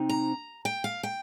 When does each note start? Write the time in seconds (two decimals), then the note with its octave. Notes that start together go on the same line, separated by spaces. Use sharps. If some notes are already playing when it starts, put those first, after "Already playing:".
Already playing: C3 C4 D#4
0.09 A#5
0.65 G5
0.84 F5
1.03 G5